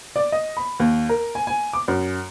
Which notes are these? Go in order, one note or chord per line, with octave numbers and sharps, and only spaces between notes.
D5
D#5
B5
D#2
A#4
G#5
G#5
D6
F#2